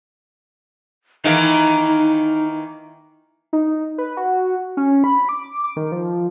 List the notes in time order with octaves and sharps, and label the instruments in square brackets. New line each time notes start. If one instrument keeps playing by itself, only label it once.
[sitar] D#3 E3 A#3 [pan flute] D#4
[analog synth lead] D#4
B4
F#4
C#4
B5
D6
D6
D#3
F3